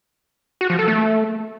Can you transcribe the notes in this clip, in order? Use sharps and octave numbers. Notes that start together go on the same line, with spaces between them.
F#4
F3
A4
A3